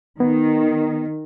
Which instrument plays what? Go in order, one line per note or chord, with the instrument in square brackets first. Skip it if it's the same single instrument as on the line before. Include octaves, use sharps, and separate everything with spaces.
[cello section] D#3 [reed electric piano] B3